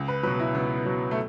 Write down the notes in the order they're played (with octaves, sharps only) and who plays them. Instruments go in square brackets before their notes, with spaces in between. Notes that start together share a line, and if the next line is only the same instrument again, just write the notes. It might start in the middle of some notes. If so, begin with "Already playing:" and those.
Already playing: [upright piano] C#2
B4
F#3 B4
B2
E4
C#2 B3
B2 F#3
A3